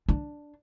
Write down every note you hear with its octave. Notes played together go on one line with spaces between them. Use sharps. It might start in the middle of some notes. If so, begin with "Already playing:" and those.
D4